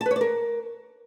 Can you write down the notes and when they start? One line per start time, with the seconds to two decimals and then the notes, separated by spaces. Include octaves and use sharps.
0.01 A5
0.06 B4
0.11 C#5
0.16 D5
0.21 A#4